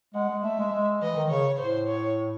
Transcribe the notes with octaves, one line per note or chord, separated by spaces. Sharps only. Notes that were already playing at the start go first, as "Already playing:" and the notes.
G#3 F#5
G#3
A3 E5
G#3
G#3
E3 D#5
D#3
C#3 C#5
A2 C5
C#5